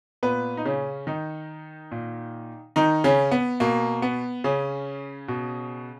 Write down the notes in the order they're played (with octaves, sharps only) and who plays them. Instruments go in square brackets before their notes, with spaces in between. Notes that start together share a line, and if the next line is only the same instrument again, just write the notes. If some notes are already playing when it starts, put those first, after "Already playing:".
[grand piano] A#2 B3 B4
D#4
C#3 C#4
D#3 D#4
A#2
D#3 D#4
C#3 C#4
B3
B2 A#3
B3
C#3 C#4
B2